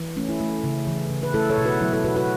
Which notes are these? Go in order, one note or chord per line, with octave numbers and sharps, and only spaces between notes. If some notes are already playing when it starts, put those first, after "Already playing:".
Already playing: E3
A3 C#4
E4
A3
C#3
E3
C#3
B4
A3 E4 A4
A4 C#5
B2
F#4 B4
F#3 E4
E4 A4
B2 F#4 B4
F#4 B4